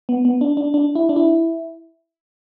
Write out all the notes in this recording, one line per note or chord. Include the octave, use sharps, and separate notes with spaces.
B3
B3
D4
D4
D4
E4
D4
E4